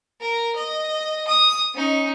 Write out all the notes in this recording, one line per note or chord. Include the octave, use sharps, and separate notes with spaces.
A#4
D#5
D#6
C#4 D#4